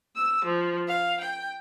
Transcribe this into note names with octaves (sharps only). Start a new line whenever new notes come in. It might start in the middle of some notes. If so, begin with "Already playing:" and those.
E6
F3
F5
G5